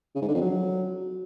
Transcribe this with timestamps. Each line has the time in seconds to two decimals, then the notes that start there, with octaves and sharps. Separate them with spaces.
0.15 C#3
0.22 G#2
0.28 D3
0.34 F2
0.41 F#3